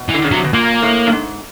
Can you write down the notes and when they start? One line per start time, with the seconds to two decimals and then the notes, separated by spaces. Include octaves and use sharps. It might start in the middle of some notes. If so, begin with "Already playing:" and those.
Already playing: B2
0.09 E3
0.14 D3
0.25 C#3
0.31 C3 F#3
0.44 B2
0.53 A#2 A#3
0.83 A2
1.07 G2
1.12 G#2